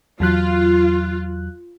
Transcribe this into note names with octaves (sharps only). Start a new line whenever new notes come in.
E2 F#3 F4 F#6